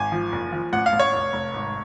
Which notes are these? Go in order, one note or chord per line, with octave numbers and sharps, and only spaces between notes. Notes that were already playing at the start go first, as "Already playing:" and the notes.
Already playing: G#1 G#5
F3
F#1
F3
A1 F#5
F5
A1
C#5
F1
F1
G#1